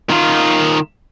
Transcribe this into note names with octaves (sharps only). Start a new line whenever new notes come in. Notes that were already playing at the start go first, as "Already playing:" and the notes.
D#3 F4